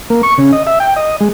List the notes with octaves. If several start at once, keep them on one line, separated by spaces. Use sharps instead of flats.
A#3
C#6
C#3
D#5
E5
G5
D#5
G#3